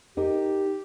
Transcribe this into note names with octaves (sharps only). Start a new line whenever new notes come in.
D#4 G4 A#4